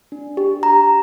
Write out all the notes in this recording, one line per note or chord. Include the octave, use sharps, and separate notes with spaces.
D4
G4
G4 A#5